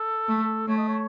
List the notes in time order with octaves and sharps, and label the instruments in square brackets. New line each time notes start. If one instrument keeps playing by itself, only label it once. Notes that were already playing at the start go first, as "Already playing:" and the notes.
Already playing: [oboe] A4
[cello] A3
[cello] A3 [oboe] C#5
[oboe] D#5
C#5